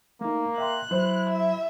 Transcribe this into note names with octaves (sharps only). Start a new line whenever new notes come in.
A3 A#3 D#4
E5 G5 C6 F#6
F#3 E4 C5
E5